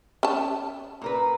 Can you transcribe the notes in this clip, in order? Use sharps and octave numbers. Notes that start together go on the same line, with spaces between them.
C#4 A5
A#2 A#4 B4